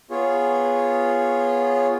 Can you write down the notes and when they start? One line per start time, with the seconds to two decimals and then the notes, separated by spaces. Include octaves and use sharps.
0.11 B3 F4 G#4 C#5